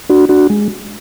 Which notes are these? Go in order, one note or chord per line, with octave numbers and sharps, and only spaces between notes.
D4 F#4
D4 F#4
G#3